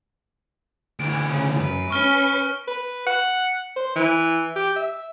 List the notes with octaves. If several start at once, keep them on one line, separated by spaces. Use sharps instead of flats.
D2 E3 D7
C#3
F#2 B4
C#4 C#6 F6 G7
B4
F#5
C5
E3
G4
E5